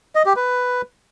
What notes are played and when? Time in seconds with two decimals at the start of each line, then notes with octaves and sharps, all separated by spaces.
0.15 D#5
0.26 G4
0.36 B4